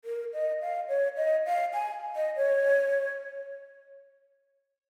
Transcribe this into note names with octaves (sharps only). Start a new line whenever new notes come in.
A#4
D#5
F5
C#5
D#5
F5
G#5
D#5
C#5